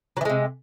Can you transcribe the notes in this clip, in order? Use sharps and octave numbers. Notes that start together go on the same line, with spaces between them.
C3 E3 F#3 G#3